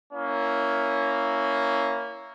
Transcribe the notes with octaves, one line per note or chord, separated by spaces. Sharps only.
A#3 C#4 E4